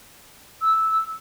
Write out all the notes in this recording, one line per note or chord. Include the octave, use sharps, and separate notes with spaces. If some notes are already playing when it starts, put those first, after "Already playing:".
E6